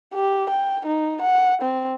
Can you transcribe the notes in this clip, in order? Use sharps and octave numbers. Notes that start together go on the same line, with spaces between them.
G4
G5
D#4
F#5
C4